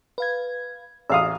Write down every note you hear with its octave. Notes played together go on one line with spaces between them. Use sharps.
B4 F5 G#6
A1 D#5 F5 G#5 D#6 E6